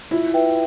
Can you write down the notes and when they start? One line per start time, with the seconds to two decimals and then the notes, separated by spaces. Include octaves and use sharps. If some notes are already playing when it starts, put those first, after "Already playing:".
0.11 E4 F4
0.34 B4 E5 G5